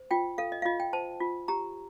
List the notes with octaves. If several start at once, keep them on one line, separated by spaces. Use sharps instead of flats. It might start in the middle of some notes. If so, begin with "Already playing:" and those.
Already playing: C5
F4 G5
A4 F5
D#5
F5
F4 D#5
G5
C5 A5
F4
G4 A#5